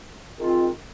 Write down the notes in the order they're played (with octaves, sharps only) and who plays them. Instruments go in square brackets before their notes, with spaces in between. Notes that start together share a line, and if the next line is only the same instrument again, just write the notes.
[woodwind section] D#3 G#3 C4 F4